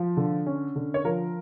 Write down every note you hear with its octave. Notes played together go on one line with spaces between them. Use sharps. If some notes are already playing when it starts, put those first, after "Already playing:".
Already playing: F3
D3
C#4
D3
C#5
F3 A#4